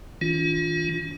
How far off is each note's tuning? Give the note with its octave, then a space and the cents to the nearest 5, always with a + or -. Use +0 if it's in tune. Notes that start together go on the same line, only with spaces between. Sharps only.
D#3 +45 D4 -30 F4 +5